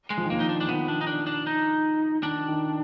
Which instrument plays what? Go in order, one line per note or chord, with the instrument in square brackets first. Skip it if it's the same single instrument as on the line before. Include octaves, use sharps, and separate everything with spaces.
[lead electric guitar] G#3
[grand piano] F3
D#3
[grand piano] F3 [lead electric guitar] A#3
[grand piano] D#3 [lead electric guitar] D#4
[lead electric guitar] D4
[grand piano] D#3 [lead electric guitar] D4
[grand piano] F3 [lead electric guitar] B3
[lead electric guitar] D4
D#4
D4
D4
D#4
[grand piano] D#3 [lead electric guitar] D4
[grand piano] D#3